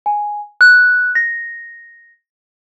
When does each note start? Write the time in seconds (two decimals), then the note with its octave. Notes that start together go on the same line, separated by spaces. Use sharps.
0.06 G#5
0.61 F#6
1.15 A#6